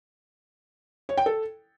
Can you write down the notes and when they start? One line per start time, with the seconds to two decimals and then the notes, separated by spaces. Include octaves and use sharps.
1.09 C#5
1.17 G5
1.26 A4